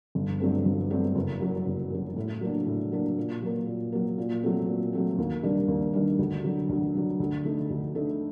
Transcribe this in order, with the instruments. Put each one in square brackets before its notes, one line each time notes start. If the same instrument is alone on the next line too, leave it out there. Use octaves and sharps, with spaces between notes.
[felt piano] G1
G2 F#3 A3 C4
G1
G2 F#3 A3 C4
F#1
F#2 F#3
F#1
F#2 F#3
A2
F#3 A#3 D4
A2
F#3 A#3 D4
A#2
F#3 A#3
A#2
F#3 A#3
A#2
F#3 A3 C4
A#2
F#3 A3 C4
D#2
D#3 G3 D4
D#2
D#3 G3 D4
D2
D3 F#3
D2
D3 F#3
D2
D3 A3 D#4
D2
D3 A3 D#4